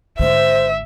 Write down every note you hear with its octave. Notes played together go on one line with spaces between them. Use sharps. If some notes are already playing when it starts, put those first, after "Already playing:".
G#1 D3 C5 E5